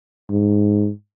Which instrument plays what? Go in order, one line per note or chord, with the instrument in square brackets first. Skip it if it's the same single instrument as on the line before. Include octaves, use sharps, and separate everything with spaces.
[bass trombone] G#2